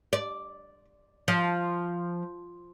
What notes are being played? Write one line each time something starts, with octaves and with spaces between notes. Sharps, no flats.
D5
F3